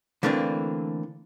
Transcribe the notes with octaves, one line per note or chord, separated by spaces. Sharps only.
D3 E3 A3 A#3 C4 D4